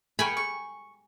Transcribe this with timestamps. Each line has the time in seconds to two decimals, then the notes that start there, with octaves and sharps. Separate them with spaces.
0.19 G#4 A#4 G5 G#5 B5 C#6
0.37 C#6